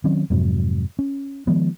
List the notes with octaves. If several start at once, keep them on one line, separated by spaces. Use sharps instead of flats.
D#3 F#3 C4 C#4
F2 G#2 C3 F#3
C#4
D#3 F3 G#3 B3